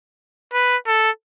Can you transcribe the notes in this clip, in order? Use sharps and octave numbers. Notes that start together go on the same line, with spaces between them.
B4
A4